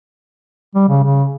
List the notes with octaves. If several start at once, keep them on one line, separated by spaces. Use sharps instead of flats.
G3
C#3
C#3